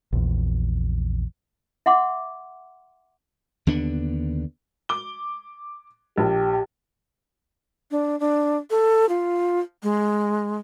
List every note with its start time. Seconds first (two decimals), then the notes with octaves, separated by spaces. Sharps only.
0.13 A#1 E2
1.86 E5 F#5 C6 D6
3.67 D#2 D3 B3 D4
4.89 D6 G7
6.18 A#1 F3 G4
7.91 D4
8.20 D4
8.70 A4
9.09 F4
9.83 G#3